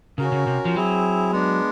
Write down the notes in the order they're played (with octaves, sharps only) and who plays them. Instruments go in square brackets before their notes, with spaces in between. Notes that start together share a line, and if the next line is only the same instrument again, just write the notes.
[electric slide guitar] C#3 [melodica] C#4 F#4 A#4
[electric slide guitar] C#3
C3
F3
[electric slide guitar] F#3 [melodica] C4 E4 G#4
[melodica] G#3 B3 D4